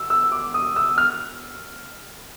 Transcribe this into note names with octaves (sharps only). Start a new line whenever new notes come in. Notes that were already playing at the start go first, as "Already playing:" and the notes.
Already playing: E6
E6
D6
D#6
E6
F6